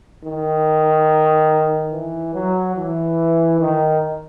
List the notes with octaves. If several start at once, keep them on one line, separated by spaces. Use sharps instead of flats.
D#3
E3
F#3
E3
D#3